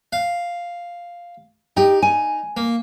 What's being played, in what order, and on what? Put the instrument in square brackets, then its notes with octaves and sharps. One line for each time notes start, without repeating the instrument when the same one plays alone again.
[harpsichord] F5
[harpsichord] D#4 [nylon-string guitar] G4 G5
[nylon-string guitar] G#5
[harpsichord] A#3